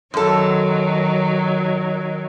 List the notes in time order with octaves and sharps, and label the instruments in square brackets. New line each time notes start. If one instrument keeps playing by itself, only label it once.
[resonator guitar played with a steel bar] F#2 A4 [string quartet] D#3 F#3